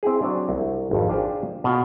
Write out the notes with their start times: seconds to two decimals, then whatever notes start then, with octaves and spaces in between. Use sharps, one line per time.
0.03 C4 E4 G4 G#4
0.22 F#3 C4 D4
0.49 C2
0.91 G#1 F2
1.09 D4 F4 G4 G#4 C5
1.64 B2 F4